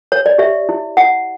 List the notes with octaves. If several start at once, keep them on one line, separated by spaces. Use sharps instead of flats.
C#5
D5
G4 E5
E4
E4 F#5